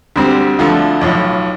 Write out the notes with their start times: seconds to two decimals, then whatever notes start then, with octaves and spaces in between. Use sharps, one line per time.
0.16 D2 D3 G3 C4
0.59 D2 D3 F3 A3
1.01 B1 A2 F3